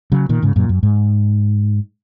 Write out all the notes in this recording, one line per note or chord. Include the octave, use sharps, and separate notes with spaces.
C#3 F#3
A#2 D#3
G#2 C#3
F#2 A#2
F#2
G#2